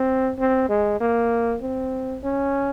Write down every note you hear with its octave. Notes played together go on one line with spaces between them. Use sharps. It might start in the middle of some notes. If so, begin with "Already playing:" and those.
Already playing: C4
C4
G#3
A#3
C4
C#4